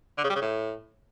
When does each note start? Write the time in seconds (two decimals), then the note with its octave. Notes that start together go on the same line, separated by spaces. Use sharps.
0.18 D3
0.24 C#3
0.30 G3
0.36 C#3
0.41 A2